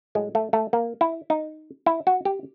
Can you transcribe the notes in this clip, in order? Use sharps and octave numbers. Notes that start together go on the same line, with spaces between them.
A2 F#3 G#3
A3
A3
A#3
E4
D#4
E4
F#4
G4